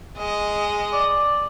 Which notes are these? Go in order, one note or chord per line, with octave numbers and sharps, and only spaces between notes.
G#3 D#5
D5